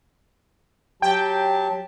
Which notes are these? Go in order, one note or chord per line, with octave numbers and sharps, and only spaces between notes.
F#3 G4 G5 A5